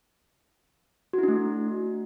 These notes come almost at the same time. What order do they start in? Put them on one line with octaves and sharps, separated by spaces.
F#4 E4 D4 A3